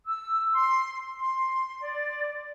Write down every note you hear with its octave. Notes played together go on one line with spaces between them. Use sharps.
E6
C6
C6
D5